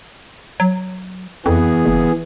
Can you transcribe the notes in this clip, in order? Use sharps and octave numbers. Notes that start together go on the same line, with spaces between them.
F#3
F2 E3 B3 G#4
F#1